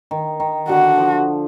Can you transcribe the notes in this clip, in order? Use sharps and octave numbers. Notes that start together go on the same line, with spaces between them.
D#3
D#3
D3 F#4
F3